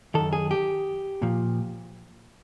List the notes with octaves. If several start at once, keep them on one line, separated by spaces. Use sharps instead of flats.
F#2 D#3 A4
G#4
G4
A#2 F3